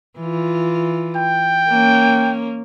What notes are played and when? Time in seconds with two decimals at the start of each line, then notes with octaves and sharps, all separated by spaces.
0.19 E3 F4
1.16 G5
1.69 A#3 C#4